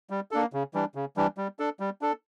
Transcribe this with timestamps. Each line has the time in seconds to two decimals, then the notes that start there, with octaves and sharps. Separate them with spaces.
0.10 G3
0.31 A#3 D4 A4
0.53 C#3
0.74 E3 G3 D4
0.95 C#3
1.17 E3 G3 D4
1.38 G3
1.59 D4 A4
1.80 G3
2.02 D4 A4